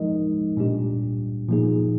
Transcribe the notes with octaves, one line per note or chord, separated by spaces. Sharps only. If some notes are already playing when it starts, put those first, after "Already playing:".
Already playing: F3 G#3 D#4 A#4 D#5
A#2 G3 D4 G4
A#2 F3 A#3 D#4 G#4